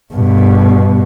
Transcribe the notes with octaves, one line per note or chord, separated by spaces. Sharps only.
G2 B2